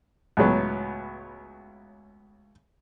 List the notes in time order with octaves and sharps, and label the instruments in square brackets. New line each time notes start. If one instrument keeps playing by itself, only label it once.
[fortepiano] C#2 A2 F#3 B3